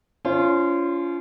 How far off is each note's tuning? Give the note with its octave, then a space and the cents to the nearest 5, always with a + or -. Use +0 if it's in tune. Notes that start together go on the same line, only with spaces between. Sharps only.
C#4 +35 F4 -25 C5 +25